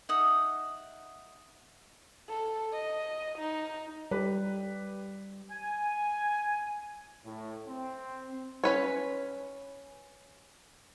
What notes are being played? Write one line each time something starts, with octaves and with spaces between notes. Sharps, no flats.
D#4 E5 F#5 D#6
A4
D#5
D#4
G3 G4 B4
G#5
A2
C4
C#4 B4 C#5